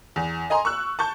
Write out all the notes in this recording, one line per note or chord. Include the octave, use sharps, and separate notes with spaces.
E2
D#5 G#5 A#5 C6
C#6 E6 F#6
A5 C#6 G6